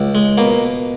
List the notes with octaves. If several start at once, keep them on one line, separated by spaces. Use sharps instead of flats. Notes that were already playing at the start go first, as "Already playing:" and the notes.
Already playing: C#2
G#3
B2 A#3